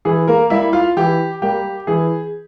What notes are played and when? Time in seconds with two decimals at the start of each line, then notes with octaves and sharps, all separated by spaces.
0.05 E3 G#4
0.28 A#3 A#4
0.50 G3 A#3 E4 E5
0.73 F4 F5
0.97 E3 G4
1.42 G3 A#3 G4
1.87 E3 G#4